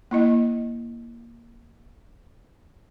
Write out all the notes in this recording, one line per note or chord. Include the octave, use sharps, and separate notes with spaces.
A#3 E4 D#5